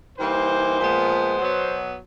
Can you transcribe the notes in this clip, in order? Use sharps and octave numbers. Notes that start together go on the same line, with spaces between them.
E3 G3 A#3 D#4 C5
A#2 F3 G#3 B3
B2 F#3 B3